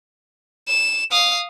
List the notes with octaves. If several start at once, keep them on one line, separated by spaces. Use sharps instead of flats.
E7
F5 D#6